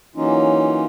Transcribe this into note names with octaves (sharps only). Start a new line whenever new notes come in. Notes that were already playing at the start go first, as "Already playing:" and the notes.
E3 F#3 A#3 C#4 D#4 F4